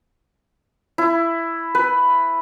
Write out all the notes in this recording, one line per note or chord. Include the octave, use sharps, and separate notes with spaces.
E4
B4